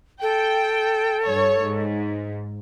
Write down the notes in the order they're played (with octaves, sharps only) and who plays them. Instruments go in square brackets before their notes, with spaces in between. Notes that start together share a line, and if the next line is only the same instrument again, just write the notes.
[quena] A4 [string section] G5
[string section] G2 C#5
G#2